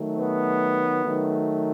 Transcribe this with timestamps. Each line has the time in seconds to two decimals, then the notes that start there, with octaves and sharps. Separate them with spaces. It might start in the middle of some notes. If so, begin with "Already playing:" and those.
Already playing: D#3 F#3 A3
0.18 B3
1.05 D#3 F#3 A3